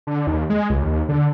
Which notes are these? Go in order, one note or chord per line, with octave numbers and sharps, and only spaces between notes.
D3
D#2
G#3
C#2
D#2
D3